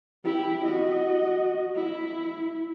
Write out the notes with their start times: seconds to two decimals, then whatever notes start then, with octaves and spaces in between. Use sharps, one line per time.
0.24 E4 G4
0.65 F#4 D#5
1.76 E4